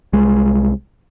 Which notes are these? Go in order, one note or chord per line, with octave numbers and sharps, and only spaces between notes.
C2 G#3